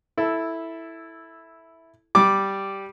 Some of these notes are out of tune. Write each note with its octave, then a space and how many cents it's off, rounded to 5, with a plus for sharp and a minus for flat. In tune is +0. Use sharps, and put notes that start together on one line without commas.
E4 -5 A4 +0
G3 -5 D6 +0